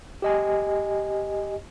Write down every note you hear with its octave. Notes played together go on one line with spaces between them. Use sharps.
G4 D#5 G#5